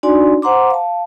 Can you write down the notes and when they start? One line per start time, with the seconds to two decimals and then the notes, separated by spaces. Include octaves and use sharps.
0.03 D4 D#4 F#4 D5 G#5 C6
0.42 C5 F#5 A#5 C6 D6
0.70 F5 A5